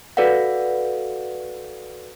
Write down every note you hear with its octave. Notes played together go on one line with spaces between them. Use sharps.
F#4 A4 B4 D5 F5 F#5